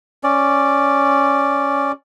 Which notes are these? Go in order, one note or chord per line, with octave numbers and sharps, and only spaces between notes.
C#4 D5